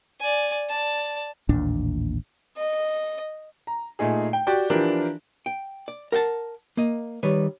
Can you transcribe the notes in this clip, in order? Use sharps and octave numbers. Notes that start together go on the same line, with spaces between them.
D5 G#5
D5 A5
A1 D#2 A#2 D4
D#5
A#5
A#2 A3 D#4 G#4
G5
F#4 G4 D5 G5
E3 F3 D4 G4 A#4
G5
D5
A#4 F#5 G5 A5
A#3 D#5
D#3 G3 B4 C#5